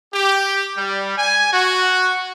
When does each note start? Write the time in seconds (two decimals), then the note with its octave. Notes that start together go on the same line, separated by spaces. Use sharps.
0.13 G4
0.77 G3
1.17 G#5
1.53 F#4